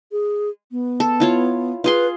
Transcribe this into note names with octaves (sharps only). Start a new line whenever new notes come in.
G#4
B3
A4
E4 F4 C#5
F4 G#4 B4 C6